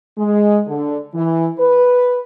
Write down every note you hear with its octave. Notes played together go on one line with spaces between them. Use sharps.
G#3
D3
E3
B4